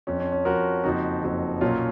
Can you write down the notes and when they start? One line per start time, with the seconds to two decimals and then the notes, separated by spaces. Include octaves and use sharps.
0.07 F2 F3 C#4
0.20 C#4
0.32 C#4
0.45 F2 F3 F#4 A#4
0.84 F#1 F2 F3 D#4 F#4
1.23 F#1 F2 F3
1.61 B1 A#2 F#3 C#4 F4